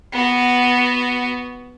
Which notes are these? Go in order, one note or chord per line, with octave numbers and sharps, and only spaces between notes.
B3 F#4